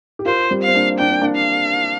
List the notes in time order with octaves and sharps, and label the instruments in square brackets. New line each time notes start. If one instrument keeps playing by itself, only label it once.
[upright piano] G4
[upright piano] F4 A#4 [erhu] C5
[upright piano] G3 C4
[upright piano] C4 [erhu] F5
[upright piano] A#3 D4
[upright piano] D4 [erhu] G5
[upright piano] C4
A#3 D4
[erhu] F5